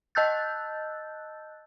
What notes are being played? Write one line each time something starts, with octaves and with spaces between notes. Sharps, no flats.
D#5 A5 E6 F#6 G6 A6